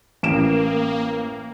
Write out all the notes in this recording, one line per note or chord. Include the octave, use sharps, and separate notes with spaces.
A1 A#3 D7 E7